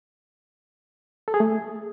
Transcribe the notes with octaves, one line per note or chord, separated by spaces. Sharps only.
A4
G#4
A3